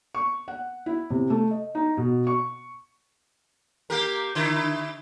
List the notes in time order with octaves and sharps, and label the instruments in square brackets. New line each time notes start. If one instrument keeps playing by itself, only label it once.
[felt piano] C#6
F#5
E4
C3
A3
D#5
D#4
B2
C#6
[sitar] A#3 G4 A#4
D3 E4